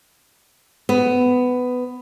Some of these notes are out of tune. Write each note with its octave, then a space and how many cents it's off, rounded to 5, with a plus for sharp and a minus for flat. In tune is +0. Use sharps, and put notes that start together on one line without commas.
B3 +15